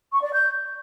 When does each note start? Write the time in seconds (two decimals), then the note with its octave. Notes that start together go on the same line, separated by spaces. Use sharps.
0.13 C#6
0.23 D5
0.33 G6